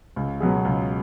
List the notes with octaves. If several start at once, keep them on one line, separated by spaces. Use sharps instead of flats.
C#2
B2 F#3 B3 G#4
C#2